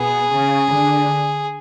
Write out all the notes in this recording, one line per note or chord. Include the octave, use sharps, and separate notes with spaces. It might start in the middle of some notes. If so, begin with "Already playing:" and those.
Already playing: B2 B3 G#4
C#3 C#4
D3 D4